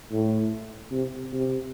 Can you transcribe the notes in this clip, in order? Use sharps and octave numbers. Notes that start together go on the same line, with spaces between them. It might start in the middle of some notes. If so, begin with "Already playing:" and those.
A2
C3
C3